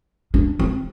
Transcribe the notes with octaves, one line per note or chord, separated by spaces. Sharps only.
D4
C4